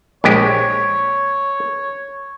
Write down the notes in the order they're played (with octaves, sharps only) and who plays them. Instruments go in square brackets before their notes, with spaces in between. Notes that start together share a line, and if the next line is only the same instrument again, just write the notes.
[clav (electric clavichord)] A#1 G#3 G4 [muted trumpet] C#5